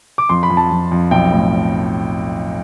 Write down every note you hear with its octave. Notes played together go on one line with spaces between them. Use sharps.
D6
F2 C6
B5
F2
A5
F2
F2
B1 G5
A2